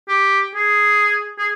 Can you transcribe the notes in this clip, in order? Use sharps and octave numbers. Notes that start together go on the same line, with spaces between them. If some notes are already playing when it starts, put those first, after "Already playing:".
G4
G#4
G#4